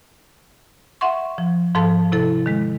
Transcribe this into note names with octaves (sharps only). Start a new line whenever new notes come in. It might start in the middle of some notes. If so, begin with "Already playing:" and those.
E5 F#5 C6 C#6
F3
G#2 F3 A4 F5 A5
C3 E4 A4
D#3 G#3